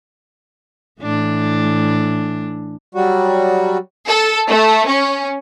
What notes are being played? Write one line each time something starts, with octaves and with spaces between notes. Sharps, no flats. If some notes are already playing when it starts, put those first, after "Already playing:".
A2 E3 D4
F#3 G3 F#4
A4
A3
C#4